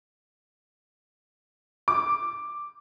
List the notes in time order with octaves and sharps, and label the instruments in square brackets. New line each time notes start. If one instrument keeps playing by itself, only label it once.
[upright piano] D6